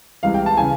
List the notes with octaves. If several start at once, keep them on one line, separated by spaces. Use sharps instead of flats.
C2 C3 E3 G#3 F5
G5
A5
C#3 E3 G#5